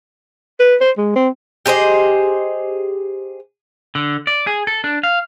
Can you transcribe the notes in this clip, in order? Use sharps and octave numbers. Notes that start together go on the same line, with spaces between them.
B4
C5
G#3
C4
G4 G#4 C5 D#5
D3
D5
G#4
A4
D4
F5